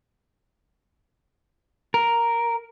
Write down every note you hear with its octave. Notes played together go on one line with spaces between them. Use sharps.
A#4